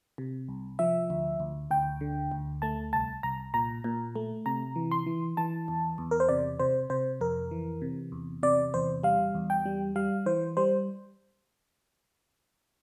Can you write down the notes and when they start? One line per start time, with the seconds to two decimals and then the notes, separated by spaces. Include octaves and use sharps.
0.18 C3
0.49 C2
0.79 F3 E5
1.10 D2
1.40 D2
1.71 D2 G5
2.01 D3
2.32 D2
2.62 A3 A5
2.93 C2 A5
3.23 C2 A#5
3.54 A#2 A#5
3.84 A#2
4.16 A3
4.46 C3 A#5
4.76 E3
4.91 C6
5.06 E3
5.37 E3 A5
5.68 E2
5.98 E2
6.11 A#4
6.20 C5
6.29 C3 D5
6.60 C3 C5
6.90 C3 C5
7.21 F2 A#4
7.51 E3
7.82 C3
8.12 E2
8.43 C3 D5
8.74 E2 C5
9.03 G3 F5
9.34 E2
9.50 G5
9.65 G3
9.96 G3 F5
10.26 E3 C5
10.57 G3 C5